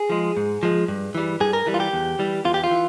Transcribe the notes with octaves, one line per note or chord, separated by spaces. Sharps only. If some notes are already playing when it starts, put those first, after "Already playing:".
Already playing: G#4
F3 G#3
G#2
F3 G#3
G2
E3 G3
G2 G#4
A#4
E3 G3
F4
G4
E2
E3 G3
E2 F4
G4
F4
E3